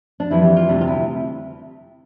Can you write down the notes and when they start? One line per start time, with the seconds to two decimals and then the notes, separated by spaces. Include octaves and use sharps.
0.20 D4
0.31 F2 E3 G3 E4
0.43 G4
0.56 F4
0.68 D2 C3 G3 D4
0.81 F4
0.87 E4